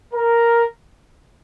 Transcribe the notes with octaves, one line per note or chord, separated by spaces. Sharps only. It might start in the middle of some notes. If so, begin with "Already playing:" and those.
A#4